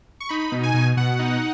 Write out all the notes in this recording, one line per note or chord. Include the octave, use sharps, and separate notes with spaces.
C#6
D#4 B5
B2
G#5
B2
B2 F#5
D#4